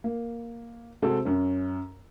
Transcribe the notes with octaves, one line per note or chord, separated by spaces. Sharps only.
A#3
C3 G#3 C4 F#4 A4
F#2 C#4